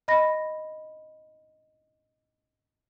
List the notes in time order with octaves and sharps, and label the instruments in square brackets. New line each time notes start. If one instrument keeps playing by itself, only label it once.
[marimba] D#5 B5 A#6